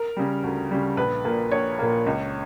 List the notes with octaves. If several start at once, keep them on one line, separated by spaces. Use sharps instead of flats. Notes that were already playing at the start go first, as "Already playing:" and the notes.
Already playing: A#4
C#3 G3
D2
C#3 G3
A#1 B4
A#2 A#3
A#1 C#5
A#2 A#3
C#2